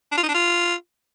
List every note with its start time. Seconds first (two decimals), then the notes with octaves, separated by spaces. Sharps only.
0.12 D4
0.17 F4
0.23 D#4
0.29 D4
0.34 F4